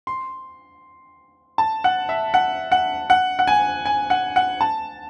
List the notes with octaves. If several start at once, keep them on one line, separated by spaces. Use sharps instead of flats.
C6
A5
F#5
E5
F#5
F#5
F#5
F#5
G#5
G#5
F#5
F#5
A5